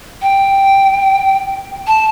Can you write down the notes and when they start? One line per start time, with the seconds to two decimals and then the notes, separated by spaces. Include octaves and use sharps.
0.22 G5
1.87 A5